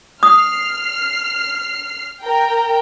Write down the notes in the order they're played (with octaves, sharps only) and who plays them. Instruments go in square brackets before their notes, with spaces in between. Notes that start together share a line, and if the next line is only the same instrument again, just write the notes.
[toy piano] D#6 [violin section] F6 C7
[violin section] A#4 G5